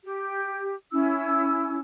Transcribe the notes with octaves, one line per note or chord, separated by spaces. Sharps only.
G4
C#4 E4 E6